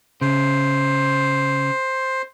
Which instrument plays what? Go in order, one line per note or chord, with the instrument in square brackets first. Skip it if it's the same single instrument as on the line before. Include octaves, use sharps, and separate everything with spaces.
[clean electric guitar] C#3 [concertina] C5